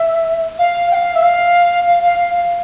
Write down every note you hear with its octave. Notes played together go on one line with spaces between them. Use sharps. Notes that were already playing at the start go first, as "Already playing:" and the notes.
Already playing: E5
F5
G5
F5
E5
F5
F5
F5
F5
F5